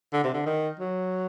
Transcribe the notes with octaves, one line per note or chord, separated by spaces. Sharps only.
D3
C3
D3
D#3
F#3